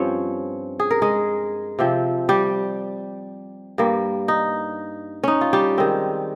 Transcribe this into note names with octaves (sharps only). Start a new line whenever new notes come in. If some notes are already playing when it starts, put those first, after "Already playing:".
Already playing: G2 F3 C4 C#4 C#5
G#4
A#4
G#3 G#4
C3 F3 C4
G3 G4
G2 G3 A#3
D#4
C#4 D#4
F4
G3 G4
D#3 G#3 C4